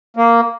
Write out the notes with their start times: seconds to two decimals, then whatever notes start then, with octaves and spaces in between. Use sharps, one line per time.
0.17 A#3